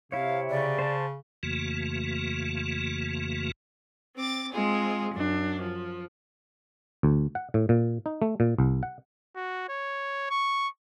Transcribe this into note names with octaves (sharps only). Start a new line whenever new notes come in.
C3 E4 C#5 F5
C#3 D5
C5 A5
F2 C#3 E3 A3 A#3 F#4
C4 D6 A6
G#3 C4 F4 G#4
F#2 D4
F3
D2
F#5
A2
A#2
D#4
A3
A#2
C2
F#5
F#4
C#5
C#6